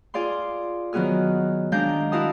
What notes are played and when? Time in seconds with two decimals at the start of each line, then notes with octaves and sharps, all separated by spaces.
0.14 F4 G#4 D5 F5 C6
0.93 D#3 F#3 B3 F#4 G#4 F6
1.72 D#3 G#3 D4 F5 A#5 G6
2.12 E4 F#4 A#4 F5 A5 D#6